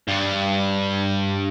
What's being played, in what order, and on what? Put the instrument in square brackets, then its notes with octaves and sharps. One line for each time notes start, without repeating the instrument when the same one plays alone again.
[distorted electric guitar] G2 G3